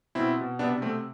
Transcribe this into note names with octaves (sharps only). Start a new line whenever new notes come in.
B2 C4 E4
B2
C3 B3 D4
A3 C4